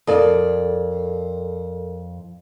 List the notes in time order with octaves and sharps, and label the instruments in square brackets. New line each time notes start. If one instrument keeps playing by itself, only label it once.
[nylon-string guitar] F2 D5 [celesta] A4 A#4